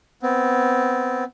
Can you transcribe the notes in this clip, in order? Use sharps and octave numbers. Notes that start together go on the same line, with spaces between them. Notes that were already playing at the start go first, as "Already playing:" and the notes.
B3 C4